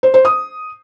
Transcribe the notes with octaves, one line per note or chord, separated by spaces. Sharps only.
C5
C5
D#6